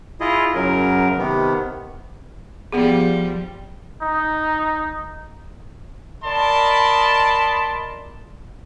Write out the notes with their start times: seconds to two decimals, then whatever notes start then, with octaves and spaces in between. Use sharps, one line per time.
0.20 E4 F4 G#4 D#5
0.55 F#2 C#3 F#3 A#4
1.18 C3 D#3 B3
2.72 F3 G3 B3 G#4
4.02 D#4
6.24 A#4 D5 D#5 A5 B5 C6